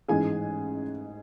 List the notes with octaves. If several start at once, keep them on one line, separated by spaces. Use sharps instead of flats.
A1 G#2 E3 G#4 G#5